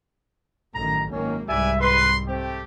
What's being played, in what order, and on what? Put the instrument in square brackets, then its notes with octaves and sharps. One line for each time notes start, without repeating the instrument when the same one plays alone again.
[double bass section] A1 F#2 D#3 [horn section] A#5
[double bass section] G#1 F#2 A#3 [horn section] D#3 C#4
[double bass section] C2 G#2 G3 [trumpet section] B4 D5 G#5 [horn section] E5
[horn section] B4 [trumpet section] B5 C6
[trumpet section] A3 G4 [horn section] C4